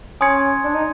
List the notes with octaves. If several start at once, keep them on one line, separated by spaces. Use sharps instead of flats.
C#4 G#5 C6 D#6 G#6 C#7
D4
D#4